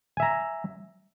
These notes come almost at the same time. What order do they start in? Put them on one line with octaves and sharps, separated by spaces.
G#5 E5 A#5